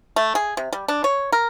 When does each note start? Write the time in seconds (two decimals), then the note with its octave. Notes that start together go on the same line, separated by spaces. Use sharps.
0.16 A3
0.35 G#4
0.57 C3
0.73 G3
0.88 D4
1.04 C#5
1.32 A#4